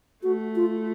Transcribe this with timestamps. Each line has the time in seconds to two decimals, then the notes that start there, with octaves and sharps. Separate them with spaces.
0.23 A3 F#4
0.56 F4